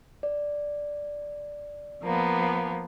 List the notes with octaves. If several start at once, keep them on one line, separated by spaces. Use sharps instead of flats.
D5
F3 A#3 B3